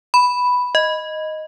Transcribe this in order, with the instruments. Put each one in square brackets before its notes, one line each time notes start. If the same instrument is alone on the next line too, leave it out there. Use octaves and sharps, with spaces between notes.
[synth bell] B5
D#5